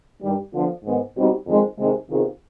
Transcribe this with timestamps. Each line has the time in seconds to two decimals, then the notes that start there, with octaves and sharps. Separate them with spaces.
0.21 G2 D#3 G3
0.53 D3 F3 B3 F4
0.84 G#2 D#3 B3
1.16 B2 G3 C4 D#4 G4
1.47 F2 D#3 G#3 C4
1.78 C3 D#3 G#3
2.10 C3 D#3 B3 F4 G#4